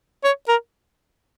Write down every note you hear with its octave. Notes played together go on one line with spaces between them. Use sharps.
C#5
A#4